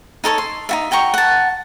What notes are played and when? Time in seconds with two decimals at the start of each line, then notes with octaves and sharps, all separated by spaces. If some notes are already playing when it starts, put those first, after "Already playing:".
0.24 D#4 A4 C5 C#5
0.38 C6
0.69 D#4 F#4 E5
0.91 F#4 G5 A#5 C#6
1.14 F#5 A5